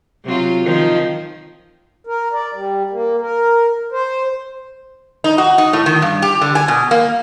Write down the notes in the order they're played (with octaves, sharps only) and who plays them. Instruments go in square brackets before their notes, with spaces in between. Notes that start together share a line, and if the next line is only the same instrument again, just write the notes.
[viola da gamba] C3 F#3 F4
D#3 F3 D#4
[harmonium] A#4
D5
G3
A#3
A#4
C5
[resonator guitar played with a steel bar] D#4
F#4
D#4
A2
D#3
G2
G4
D3
G#5
B2
A#3